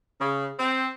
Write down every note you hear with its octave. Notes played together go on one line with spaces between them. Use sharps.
C#3
C4